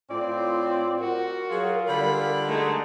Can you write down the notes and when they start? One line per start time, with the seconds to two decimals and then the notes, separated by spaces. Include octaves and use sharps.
0.10 A2 C4 F4 D5
1.00 F#4 A#4
1.50 F#3 F4 G#4
1.88 D3 G3 B5
2.47 G#3 A3 D#4